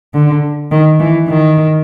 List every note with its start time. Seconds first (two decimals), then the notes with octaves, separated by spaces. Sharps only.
0.14 D3
0.71 D#3
1.00 E3
1.28 D#3